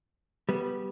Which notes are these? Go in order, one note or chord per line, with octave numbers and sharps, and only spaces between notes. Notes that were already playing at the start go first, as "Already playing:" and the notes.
G3 B3